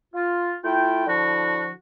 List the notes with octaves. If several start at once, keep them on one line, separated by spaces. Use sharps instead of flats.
F4
A3 E4 F4 G5
D3 F3 E4 F#4